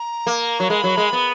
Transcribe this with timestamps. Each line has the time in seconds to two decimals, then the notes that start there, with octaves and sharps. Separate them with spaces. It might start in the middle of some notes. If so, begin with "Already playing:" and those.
Already playing: A#5
0.27 A#3
0.60 F#3
0.69 G#3 B5
0.84 F#3
0.97 G#3
1.13 B3